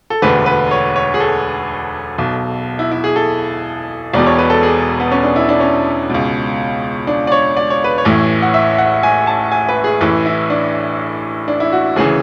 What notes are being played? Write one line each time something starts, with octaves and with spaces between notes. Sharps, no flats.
A4
E1 D2 D3 B4
B4
C#5
C#5
G#4
A4
B1 B2
E4
E4
G#4
A4
E1 E2 B2 D5
C#5
B4
A4
G#4
B3
C#4
D4
E4
D4
C#4
C#2 B2
D4
D5
C#5
D5
C#5
B4
C#5
A1 A2 E3
F#5
E5
F#5
G#5
A5
G#5
B4
G#4
A1 A2 E3 B4
E4
D4
D4
E4
F#4
D2 C#3 E3 G#4